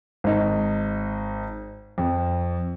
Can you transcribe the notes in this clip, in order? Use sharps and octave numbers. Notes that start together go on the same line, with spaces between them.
G#1 D#4
F2